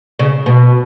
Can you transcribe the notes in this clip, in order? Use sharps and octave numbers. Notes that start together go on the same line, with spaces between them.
C#3
B2